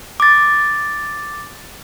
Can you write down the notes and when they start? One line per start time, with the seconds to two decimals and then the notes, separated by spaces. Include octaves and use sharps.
0.20 D6 A6